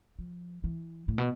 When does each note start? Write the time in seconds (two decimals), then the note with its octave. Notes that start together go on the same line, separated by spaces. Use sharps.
0.19 F3
0.64 E3
1.08 A2
1.18 B2